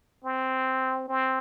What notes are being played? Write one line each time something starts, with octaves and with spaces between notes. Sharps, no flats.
C4
C4